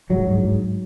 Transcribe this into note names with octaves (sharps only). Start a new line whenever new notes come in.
G#2 F#3
G#2
G#2